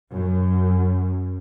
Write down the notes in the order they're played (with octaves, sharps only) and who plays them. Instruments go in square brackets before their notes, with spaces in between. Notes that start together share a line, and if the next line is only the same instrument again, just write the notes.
[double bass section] F#2